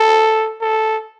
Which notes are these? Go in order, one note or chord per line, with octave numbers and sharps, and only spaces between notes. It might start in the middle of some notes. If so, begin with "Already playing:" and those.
Already playing: A4
A4